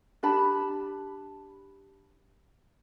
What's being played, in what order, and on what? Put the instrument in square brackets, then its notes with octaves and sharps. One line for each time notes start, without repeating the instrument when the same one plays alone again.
[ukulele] D4 G4 A5 B5